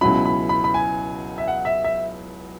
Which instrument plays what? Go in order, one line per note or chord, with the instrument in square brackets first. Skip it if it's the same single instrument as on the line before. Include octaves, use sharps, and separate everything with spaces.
[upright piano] C#2 B2 F#3 C#4 E4 [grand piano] B5
[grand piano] B5
B5
B5
G#5
E5
F#5
E5
E5